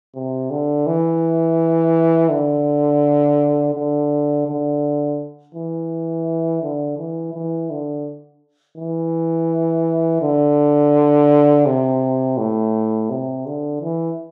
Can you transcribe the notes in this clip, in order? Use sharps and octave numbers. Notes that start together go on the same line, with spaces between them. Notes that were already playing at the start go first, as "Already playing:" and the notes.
C3
D3
E3
D3
D3
D3
E3
D3
E3
E3
D3
E3
D3
C3
A2
C3
D3
E3